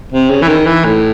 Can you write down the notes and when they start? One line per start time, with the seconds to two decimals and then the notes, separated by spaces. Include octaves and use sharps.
0.12 C3
0.30 C#3
0.42 E3
0.48 D#3
0.66 E3
0.85 A2